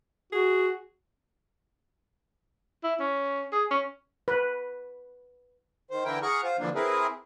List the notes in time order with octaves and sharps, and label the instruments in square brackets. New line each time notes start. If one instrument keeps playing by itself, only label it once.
[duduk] F#4 [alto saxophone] G#4
[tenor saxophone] E4
C#4
G#4
C#4
[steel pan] B4
[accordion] D#3 C5
D3 E3 E4 A#4 G5
G#4 F#5 A#5 C#6 F6
F4 C5
D3 E3 F3 A#3 D4
C4 E4 G#4 A#4 B4